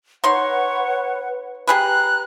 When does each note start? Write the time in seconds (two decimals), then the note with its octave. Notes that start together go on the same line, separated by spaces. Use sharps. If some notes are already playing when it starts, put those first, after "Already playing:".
0.24 D#4 B4 C#5 F#5 C6
1.67 G4 G#4 B4 A#5 F#6